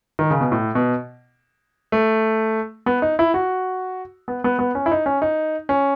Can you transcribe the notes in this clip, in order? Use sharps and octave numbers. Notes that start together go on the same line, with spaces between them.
D#3
C#3
B2
A2
B2
A3
B3
D#4
E4
F#4
B3
B3
B3
C#4
E4
D#4
C#4
D#4
C#4